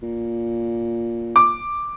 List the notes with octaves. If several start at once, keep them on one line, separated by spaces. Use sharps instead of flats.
A#2
D6